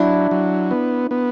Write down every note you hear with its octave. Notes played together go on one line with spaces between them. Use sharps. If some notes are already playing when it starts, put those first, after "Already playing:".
Already playing: F#3 D4 E4
F#3
B3
B3